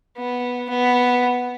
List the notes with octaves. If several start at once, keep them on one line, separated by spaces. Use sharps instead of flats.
B3
B3